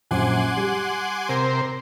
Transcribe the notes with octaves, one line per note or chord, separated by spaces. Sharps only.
A#1 F#2 F#5 G#5 C6 D6
G3
C3 A#4 C5